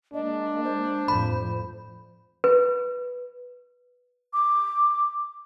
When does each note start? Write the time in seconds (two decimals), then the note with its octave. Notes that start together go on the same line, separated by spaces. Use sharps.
0.14 G#3 A#3 D4 D#5
0.64 C5
1.08 F2 A2 B5
2.44 B4
4.33 D6